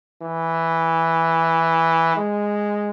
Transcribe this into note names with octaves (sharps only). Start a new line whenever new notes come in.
E3
G#3